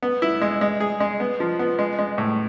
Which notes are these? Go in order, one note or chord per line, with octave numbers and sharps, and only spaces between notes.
B3
E4
G#3
G#3
G#4
G#3
B3
F3
B3
G#3
G#3
A2